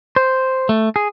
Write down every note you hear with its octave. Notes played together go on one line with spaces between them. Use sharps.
C5
A3
G#4